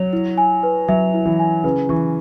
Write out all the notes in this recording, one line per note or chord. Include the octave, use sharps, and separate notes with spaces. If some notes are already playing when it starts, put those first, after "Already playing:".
Already playing: F#3 C#5
E4
G#5
B4
F#3 E5
E4
E3
G#5
C#3 B4
E3 C#6